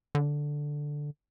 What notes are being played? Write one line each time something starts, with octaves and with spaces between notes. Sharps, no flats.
D3